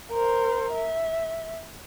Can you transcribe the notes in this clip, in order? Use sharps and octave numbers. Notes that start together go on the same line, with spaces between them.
A#4 C5
E5